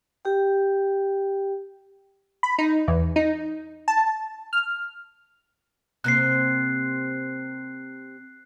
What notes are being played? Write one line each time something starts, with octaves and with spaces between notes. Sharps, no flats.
G4 G5
B5
D#4
E2
D#4
A5
F6
C3 A#3 C4 F#6 C7